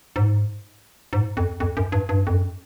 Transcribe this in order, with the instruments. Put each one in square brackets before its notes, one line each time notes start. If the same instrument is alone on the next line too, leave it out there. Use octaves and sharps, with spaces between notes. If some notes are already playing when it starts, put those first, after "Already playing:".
[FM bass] G#2
G#2
F2
F2
F#2
G2
G2
F2
F#2